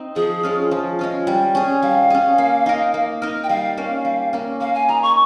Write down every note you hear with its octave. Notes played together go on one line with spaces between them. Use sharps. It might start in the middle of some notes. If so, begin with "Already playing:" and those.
Already playing: C4 D#4
F3 G#4
G#3 C#4 F4
F3
G#3 C#4 F4
G3
C#4 G#4
G3 F5
C#4 G#4
A#3
D#4 A#4
A#3
D#4 A#4
G5
G3 F5
A#3 C#4
G3
A#3 C#4
A#3 F5
G#5
D#4 G#4 A#5
C#6